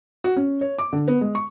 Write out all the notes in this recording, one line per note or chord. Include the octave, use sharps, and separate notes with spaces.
F#4
C#4
C#5
D6
D3
B3
G#3
C#6